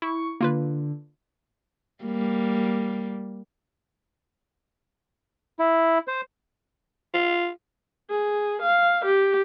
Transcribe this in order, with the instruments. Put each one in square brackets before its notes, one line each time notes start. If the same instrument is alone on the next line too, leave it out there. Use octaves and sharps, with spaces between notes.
[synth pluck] E4 [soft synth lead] C#6
[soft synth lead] D3 [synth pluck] A#3 F4 B4
[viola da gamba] G3 A#3
[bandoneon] E4
C5
[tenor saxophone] F4
[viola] G#4
F5
G4